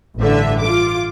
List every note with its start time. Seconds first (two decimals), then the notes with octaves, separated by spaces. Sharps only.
0.19 A1 G2 D3 E5
0.60 F4 D6